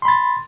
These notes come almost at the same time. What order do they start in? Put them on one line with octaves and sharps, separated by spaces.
C6 B5 A6